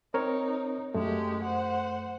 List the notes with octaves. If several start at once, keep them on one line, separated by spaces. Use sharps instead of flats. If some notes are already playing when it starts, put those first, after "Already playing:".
C4 D#4 A#4 C#5
F#2 G#3 A3 G4
C5 F#5